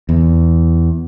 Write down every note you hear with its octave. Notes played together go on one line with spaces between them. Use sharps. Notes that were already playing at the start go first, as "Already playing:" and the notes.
E2